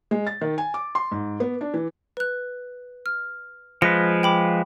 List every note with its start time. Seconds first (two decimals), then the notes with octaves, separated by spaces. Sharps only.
0.11 G#3
0.27 A6
0.41 D#3
0.58 G#5
0.74 D6
0.95 C6
1.11 G#2
1.40 B3
1.61 D4
1.74 E3
2.17 B4 F#6
3.06 F6
3.82 F3 G#3 B4 A#6 C#7
4.23 G5 B5 D6